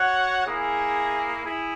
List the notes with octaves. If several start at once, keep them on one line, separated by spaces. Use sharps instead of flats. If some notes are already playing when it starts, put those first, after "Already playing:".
Already playing: F#4 C#5 F#5
A#3 E4 G#4
E4 G#4